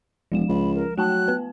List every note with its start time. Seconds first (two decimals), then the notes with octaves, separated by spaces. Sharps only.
0.32 E1 F3 G#3 E7
0.49 C#2 B5
0.75 A#4
0.98 F#3 A3 G5 A5 F#6
1.28 B3 B4